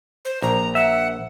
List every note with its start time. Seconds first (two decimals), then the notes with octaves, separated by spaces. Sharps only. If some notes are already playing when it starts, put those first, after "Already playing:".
0.25 C5
0.42 A#1 A#5
0.75 E5 F#5